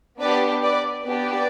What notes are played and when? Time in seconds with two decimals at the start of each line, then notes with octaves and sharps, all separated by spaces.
0.20 B3 D4 G4 B4 D5
0.63 B4 D5
1.05 B3 D4 G4 B4 D5